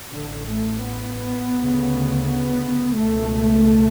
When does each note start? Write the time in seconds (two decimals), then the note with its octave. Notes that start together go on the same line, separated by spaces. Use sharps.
0.12 A1 A2 D3
0.47 A3
0.82 B3
1.54 D2 C#3
2.24 B3
2.95 C#2 B2 A3